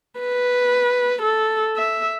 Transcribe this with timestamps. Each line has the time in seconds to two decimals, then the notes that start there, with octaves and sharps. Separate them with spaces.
0.20 B4
1.22 A4
1.76 E5